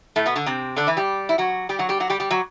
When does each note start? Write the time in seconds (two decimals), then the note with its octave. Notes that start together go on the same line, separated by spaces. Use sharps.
0.16 A2 A3
0.26 B2 B3
0.36 D3 D4
0.46 C3 C4
0.76 D3 D4
0.87 E3 E4
0.97 G3 G4
1.29 E4
1.38 F#3 F#4
1.69 G3 G4
1.79 F#3 F#4
1.89 G3 G4
2.00 F#3 F#4
2.10 G3 G4
2.20 G3 G4
2.31 F#3 F#4